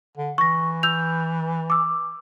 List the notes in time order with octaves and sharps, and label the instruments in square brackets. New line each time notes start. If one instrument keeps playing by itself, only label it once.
[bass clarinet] D3
[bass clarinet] E3 [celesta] C#6 A#6
[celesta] E6 G6 F7
D6 E6